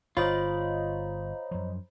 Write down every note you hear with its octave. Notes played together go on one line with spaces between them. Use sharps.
G1 F4 C5 C#5 D#5 A#5 B5
F#2 F3